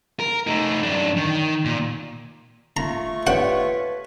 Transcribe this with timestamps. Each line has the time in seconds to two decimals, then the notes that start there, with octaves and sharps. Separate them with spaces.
0.19 A#4
0.47 A3 D#4
0.83 F#2 D4
1.17 D#3
1.65 A#2
2.77 A3 F4 A#5 C#6
3.27 G4 B4 C#5 F#5